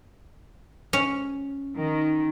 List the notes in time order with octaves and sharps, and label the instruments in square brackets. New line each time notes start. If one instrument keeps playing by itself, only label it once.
[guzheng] C#4
[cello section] D#3